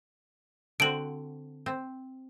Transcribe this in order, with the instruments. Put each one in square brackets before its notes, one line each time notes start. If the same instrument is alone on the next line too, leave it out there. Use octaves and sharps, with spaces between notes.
[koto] D3 C4 F#4 [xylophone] D7 F#7
[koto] C4